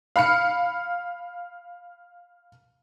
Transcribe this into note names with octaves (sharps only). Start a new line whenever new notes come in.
F5 B5 F6 C#7